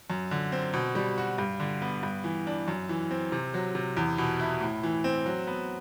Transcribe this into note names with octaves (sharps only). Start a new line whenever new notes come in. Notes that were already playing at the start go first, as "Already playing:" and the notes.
F#2
D3
C4
B2
G3
F#4
G2
D3
B3
G2
E3
D4
F#2
E3
C4
C3
F#3
C3
E2
B2
E4
A2
E3
C4
F#3
B3